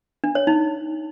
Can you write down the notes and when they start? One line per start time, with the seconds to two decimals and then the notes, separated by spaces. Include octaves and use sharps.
0.24 D4
0.35 C#5
0.47 D#4